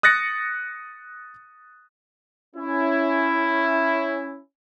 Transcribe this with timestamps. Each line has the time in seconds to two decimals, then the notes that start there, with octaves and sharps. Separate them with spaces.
0.03 D#6 F#6 A6 A#6 C#7
2.56 C#4 E4